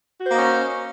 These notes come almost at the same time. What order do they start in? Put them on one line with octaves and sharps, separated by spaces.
F#4 C5 A#3 D#4 C#4